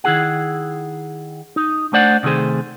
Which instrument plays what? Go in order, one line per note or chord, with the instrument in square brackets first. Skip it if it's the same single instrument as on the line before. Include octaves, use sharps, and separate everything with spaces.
[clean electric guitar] D#3 E4 G#4 F#5
D#4
A3 D4 C5 D5 F#5
C3 D#3 A3 G#4 C5